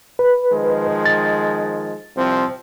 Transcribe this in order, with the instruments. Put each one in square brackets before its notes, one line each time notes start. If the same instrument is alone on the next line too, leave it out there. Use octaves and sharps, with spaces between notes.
[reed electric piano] B4
[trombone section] D#3 F3 G#3
[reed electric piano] A6
[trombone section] C2 F3 C4